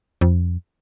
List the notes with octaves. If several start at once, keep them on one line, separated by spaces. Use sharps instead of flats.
F2